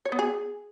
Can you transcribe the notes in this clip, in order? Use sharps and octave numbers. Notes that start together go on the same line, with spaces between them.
C#5
B3
G#4